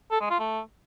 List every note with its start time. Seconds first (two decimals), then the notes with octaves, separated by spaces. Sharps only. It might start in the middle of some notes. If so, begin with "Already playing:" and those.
0.11 A4
0.21 G#3
0.30 F4
0.39 A3